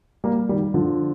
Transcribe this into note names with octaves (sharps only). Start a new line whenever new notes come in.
G3 A#3
D#3 G3
D3 F3